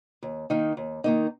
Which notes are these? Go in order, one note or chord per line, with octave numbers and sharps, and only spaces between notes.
D#2
D#3 A#3 D#4
D#2
D#3 A#3 D#4